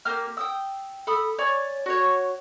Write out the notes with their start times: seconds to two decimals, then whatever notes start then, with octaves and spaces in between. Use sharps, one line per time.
0.05 A#3 G4 F6
0.37 G5 D#6 E6
1.07 A4 B5 D#6
1.39 C#5 D5 G#5
1.86 F#4 C#5